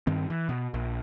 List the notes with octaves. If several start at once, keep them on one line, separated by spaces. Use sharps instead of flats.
G2 D#3 C4
E3
B2
A#1